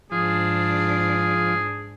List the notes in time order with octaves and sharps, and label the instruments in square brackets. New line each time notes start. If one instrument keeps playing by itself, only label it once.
[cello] G#2 D4 [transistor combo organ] F3 [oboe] G#4